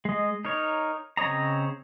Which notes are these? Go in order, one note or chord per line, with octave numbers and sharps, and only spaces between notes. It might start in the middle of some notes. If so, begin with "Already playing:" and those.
G#3 D#5
D#4 A#4 C#5
C#3 C4 C#5 D#5 A#5